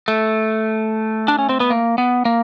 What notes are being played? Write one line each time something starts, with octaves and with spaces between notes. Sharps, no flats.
A3
D4
C#4
C4
B3
A#3
B3
A#3